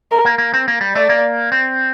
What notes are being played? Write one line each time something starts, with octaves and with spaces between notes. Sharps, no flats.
A#4
A#3
A#3
C4
A#3
G3
A3 D5
A#3
C4